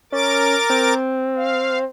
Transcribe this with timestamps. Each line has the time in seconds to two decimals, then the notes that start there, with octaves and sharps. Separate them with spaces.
0.12 C#4 A#4 D6 A6
0.70 C4
1.36 F5